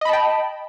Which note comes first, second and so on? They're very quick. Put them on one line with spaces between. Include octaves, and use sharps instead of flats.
D#5 B5 A5 G5